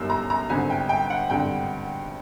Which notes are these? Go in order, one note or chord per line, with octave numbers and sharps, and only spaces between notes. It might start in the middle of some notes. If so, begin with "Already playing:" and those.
Already playing: G1 F#2 D#3 G3 A#3 E6
A#5
A#5
G#1 G2 D3 G#5
G5
G5
F#5
G#1 G2 D3 G5